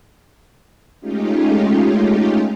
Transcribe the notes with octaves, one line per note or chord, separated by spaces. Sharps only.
G#3 A3 C#4 D#4 F4 G4